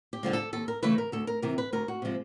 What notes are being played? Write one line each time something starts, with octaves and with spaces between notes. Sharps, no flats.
G4
D3 F3 G#3
A4
D#2 A4
A#4
C#3 E3 A3 B4
A#4
D2 A4
A#4
C3 E3 A#4
B4
D2 A#4
F#4
C3 F3 G#3